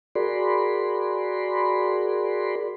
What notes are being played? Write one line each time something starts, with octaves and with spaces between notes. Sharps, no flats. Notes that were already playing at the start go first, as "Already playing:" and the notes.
F#4 G#4 A#4 D5 B5 C6